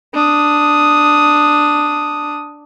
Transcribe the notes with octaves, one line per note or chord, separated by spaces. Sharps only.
D4 D#6